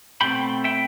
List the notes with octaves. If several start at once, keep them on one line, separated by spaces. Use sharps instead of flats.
B2 A3 C4 G5 B5
E5 G5